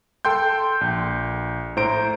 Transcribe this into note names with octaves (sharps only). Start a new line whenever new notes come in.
A4 G5 C6 G6
A#1
A2 C5 A#5 D7